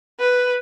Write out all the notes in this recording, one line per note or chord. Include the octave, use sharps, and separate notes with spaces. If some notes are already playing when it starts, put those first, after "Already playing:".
B4